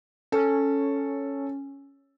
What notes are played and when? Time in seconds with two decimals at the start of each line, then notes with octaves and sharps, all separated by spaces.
0.32 C#4 A4